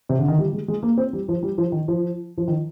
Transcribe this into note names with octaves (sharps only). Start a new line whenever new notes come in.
C3
D3
D#3
G3
G#3
G#3
A#3
C4
G3
F3
G3
F3
D#3
F3
F3
D#3